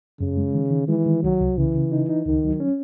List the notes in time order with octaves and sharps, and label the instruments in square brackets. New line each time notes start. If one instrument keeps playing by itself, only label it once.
[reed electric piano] F#2 [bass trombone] C#3
[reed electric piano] G#3
D#3
D#3
[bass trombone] E3 [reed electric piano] G#3
[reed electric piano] D#3
[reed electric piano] C2 [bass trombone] F#3
[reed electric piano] C2
[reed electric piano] C#3 [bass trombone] E3
[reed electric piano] C#3
D#4
D#4
[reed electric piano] C#2 [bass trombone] D#3
[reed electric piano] F#3
C#4